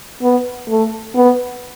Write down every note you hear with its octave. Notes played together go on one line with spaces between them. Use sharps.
B3
A3
B3